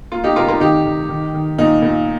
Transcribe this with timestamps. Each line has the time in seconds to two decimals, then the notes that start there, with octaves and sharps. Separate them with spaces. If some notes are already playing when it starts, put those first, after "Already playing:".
0.12 A#3 F4
0.24 D#4 G4
0.36 C3 F4 A#4
0.48 F4 A#4
0.60 D#3 D#4 G4
0.86 D#3
1.09 D#3
1.34 D#3
1.59 A#2 D#4
1.82 A#2